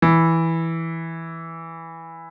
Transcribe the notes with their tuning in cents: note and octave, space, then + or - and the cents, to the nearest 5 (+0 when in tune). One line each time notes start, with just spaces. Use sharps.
E3 -5